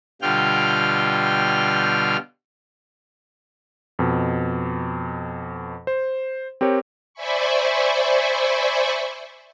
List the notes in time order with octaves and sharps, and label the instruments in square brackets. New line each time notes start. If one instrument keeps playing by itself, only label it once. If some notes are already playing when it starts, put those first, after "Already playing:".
[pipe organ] B2 D3 G3 F4 G5 F6
[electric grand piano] F2 B2
C5
C4 G4 A#4 C#5
[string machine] C5 D5 E5 G#5 B5 C#6